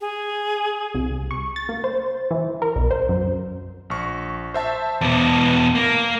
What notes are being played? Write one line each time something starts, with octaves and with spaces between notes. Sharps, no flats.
G#4
C2
C#6
A6
A#3
C5
E3
A#4
B1
C5
F#2
A#1 C#6
C5 E5 A5
E2 B2 A5 D6
A#3